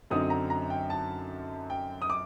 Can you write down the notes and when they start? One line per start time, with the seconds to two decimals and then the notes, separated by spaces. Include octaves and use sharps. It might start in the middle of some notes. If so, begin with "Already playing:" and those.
0.10 F#2 D3 F#3 C4 D#4 D#6
0.30 A#5
0.50 A#5
0.70 G5
0.90 A5
1.70 G5
2.02 D#6
2.10 D6